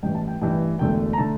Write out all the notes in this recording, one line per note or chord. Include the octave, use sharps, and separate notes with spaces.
A1 G2 E3 G5
A5
G5
A1 G2 E3 G5
E1 E2 D3 A3 G5
A#5
D3 A3 A5